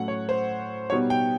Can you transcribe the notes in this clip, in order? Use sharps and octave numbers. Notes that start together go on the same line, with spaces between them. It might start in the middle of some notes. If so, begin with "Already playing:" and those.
Already playing: A2 F#3 A3 C#4 F#5
C#5
C5
B2 G3 B3 D#4 C#5
G5